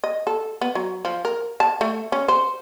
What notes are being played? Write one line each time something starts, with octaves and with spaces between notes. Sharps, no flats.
D#5
A4
B3
F#3
F3
A#4
A5
A3
C#4
C5